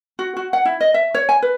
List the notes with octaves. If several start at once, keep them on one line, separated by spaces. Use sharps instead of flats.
F#4
F#4
F#5
E4
D#5
E5
C#5
G#5
B4